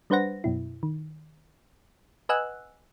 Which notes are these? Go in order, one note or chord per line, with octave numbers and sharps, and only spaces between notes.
G3 D4 B4 C5 F#5 A#6
F#2 B2 E4
D#3
B4 D#5 F#5 G#5 E6 F#6